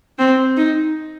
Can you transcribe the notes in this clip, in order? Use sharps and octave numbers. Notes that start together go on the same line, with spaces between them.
C4
D#4